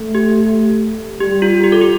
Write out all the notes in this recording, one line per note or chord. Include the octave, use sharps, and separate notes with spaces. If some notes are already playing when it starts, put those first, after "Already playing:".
Already playing: A3
G4
G3 G4
F4
G4
A4
G4